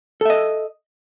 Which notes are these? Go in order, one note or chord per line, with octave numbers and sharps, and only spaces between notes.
A4 D#5 E5